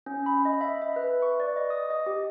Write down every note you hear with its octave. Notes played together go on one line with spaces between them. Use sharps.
C#4
B5
D#5
E5
E5
B4
C#6
D5
D#5
D#6
D#5
G4